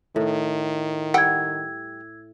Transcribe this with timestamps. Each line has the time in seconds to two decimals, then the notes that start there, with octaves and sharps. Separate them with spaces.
0.16 A2 D#3
1.14 G3 F#5 G5 E6 G#6